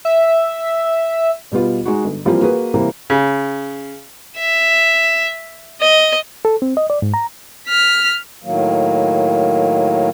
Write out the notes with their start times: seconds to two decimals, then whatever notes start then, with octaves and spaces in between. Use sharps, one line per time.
0.05 E5
1.52 B2 G3 B3 F4
1.86 G#3 D#4 F#4
2.04 G1
2.25 E3 F3 G3 A#3 C4 F4
2.41 A#3 F#4 G#4 B4
2.74 C3 E3 G3 A#3 C4
3.10 C#3
4.37 E5
5.81 D#5
6.45 A4
6.62 C4
6.77 D#5
6.90 D5
7.02 G#2
7.14 A#5
7.68 F6 B6
8.43 A2 D#3 F#3 A#3